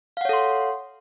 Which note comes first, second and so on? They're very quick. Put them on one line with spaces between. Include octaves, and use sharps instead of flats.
F5 F#5 C#5 A4 C6